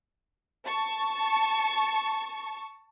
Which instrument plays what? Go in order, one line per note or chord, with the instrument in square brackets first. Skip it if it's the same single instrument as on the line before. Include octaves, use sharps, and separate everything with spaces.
[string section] A5 C#6